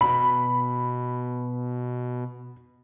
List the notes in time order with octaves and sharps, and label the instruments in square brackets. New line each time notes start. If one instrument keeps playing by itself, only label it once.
[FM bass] B2 [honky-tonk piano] B5